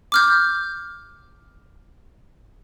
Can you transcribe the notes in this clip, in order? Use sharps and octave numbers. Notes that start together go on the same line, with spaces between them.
D6 F6 G6